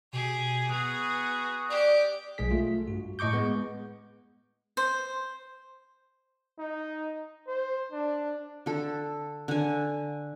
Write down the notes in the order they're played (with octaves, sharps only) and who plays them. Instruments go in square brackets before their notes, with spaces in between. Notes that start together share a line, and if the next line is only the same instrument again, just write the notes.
[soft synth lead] B2 [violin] G4 G#4
[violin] B3 G#4 [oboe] F#4 [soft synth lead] D#6
[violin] G4 [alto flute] D5
[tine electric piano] B1 G#3 G#4 B6
A3 F4
G2 F#4
A2 D#5 C#6 D6 G6
G#3 B3
[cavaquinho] C5
[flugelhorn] D#4
C5
D4
[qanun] D3 A4
D3 G#5